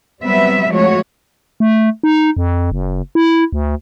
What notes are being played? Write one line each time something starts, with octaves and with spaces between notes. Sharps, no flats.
F#3 G3 B3 C4 B4 E5
F3 G#3 A3 F#4 C#5
A3
D#4
F2
F#1
E4
D2